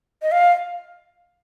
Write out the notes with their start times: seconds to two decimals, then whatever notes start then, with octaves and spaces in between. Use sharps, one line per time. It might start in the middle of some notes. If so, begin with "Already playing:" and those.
0.22 D#5
0.32 F5